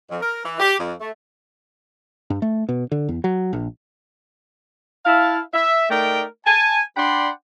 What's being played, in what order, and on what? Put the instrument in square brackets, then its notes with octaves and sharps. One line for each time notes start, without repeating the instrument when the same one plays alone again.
[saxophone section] F2
A#4
E3
G4
F2
A3
[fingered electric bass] G2
A3
B2
D3
E2
F#3
A#1
[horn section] E4 F5 A5
E5
A3 D#4 A#4 D5 G5
G#5 A5
D4 D5 F#5 G5 B5 C6